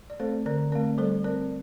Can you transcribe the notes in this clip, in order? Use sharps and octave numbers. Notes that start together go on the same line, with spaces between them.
D5
A3 C4 A4 C5
D3 A#4 D5
A3 C4 A#4 D5
G3 A4 C5
C4 A#4 D5